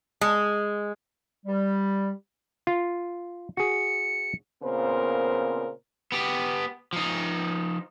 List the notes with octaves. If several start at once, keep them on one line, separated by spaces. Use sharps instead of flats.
G#3
G3
F4
F#4 G#4 C#7
A#2 C#3 B3 C4 A#4 C5
B3 G4
F3 D#4